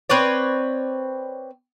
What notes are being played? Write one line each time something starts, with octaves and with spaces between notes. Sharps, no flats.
C4 B4 C#5 D5